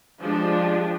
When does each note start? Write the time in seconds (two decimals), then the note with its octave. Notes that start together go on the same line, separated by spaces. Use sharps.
0.20 F3 G#3 D4 G4